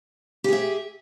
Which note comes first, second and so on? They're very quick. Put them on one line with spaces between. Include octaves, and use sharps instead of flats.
G4 G#4 E5